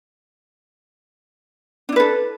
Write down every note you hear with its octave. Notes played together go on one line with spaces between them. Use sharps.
D4 E4 A4 B4